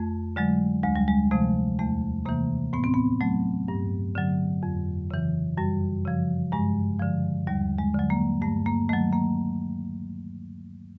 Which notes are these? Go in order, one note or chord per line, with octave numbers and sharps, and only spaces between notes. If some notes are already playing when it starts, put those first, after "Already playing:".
Already playing: F2 A3
D3 F#3 G#3
D2 G#3
G3
G#3
C3 F3 A3
E2 A3
C3 E3 A#3
A2 B3
C4
B3
F#3 A3
G2
D3 F#3
F2
C#3 E3
F#2 G3
C#3 F3
G2 G#3
D3 F3
D#2 G3
G#3
D3 F#3
A#3
G2 A3
A#3
D#3 F#3 A3
A#3